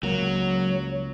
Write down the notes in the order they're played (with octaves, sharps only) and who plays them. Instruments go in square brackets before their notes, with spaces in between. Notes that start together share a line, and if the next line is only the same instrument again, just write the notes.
[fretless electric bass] C#2 A#3 [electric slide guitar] F#3 [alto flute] C#5